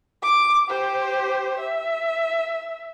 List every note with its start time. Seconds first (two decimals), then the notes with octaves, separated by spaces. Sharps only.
0.23 D6
0.69 G4 C5
1.59 E5